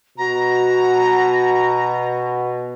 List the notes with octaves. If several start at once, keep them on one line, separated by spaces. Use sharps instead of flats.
B2 F#4 A#5